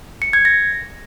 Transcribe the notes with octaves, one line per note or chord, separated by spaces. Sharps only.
C#7
G#6
A#6